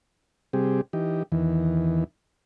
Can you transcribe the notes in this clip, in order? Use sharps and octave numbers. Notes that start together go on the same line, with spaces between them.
C3 G3 C4 G4 G#4
E3 D#4 G4
E2 D#3 E3